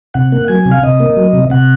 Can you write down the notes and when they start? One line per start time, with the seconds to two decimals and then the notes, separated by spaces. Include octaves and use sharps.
0.14 C3 F#5
0.32 A#3
0.48 F#3 G#5
0.66 C3
0.72 F5
0.83 C3 D#5
1.00 A#3
1.17 F#3
1.33 C3
1.50 C3 F#5